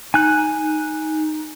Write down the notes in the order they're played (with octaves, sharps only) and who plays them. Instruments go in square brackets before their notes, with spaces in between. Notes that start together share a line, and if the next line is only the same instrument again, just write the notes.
[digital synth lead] D#4 [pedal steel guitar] G#5 F#6